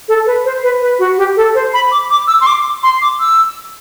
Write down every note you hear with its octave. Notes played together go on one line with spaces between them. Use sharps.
A4
B4
C5
B4
B4
F#4
G4
A4
C5
B5
D6
D6
E6
C6
D6
C6
D6
E6